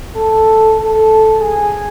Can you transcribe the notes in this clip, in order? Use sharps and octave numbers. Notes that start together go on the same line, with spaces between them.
A4
A4
G#4